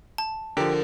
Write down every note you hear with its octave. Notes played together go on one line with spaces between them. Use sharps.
A5
D3 F3 G4 A#4